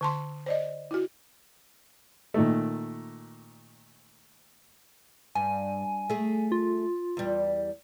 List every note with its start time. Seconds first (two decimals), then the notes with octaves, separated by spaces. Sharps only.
0.01 D3 A5 C6
0.46 C5 D5 D#5
0.91 E4 F#4
2.34 A#2 D#3 A3
5.35 G2 G#5
6.10 A3 G#4
6.52 F4
7.17 E2 G3